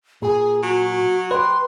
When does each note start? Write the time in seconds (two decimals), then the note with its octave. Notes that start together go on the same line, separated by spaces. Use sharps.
0.22 A#2 G#4 G#5
0.63 F#3 F#4
1.31 G4 B4 C5 C6